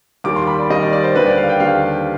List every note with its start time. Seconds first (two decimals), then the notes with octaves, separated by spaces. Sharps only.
0.24 D#2 D#3 G3 D6
0.36 C6
0.47 B5
0.59 D5
0.70 D#2 D#3 G3 D#5
0.81 D5
0.93 D5
1.04 C5
1.15 D#2 D3 G3 B4
1.26 D5
1.38 F5
1.49 G5
1.60 D#2 D3 G3 F5